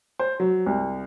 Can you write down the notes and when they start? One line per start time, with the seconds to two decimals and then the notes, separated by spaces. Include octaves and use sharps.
0.20 C5
0.40 F#3
0.66 C2